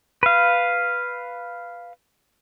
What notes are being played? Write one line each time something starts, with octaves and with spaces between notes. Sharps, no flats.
B4 F5